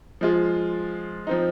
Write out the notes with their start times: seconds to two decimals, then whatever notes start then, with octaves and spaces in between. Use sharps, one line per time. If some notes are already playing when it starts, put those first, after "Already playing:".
0.21 F3 G#3 F4
1.27 F3 C4 D#4